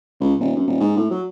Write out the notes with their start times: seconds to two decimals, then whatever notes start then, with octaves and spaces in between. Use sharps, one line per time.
0.21 C#2
0.40 D#1
0.56 F#2
0.68 D#1
0.80 G#2
0.97 A2
1.11 F#3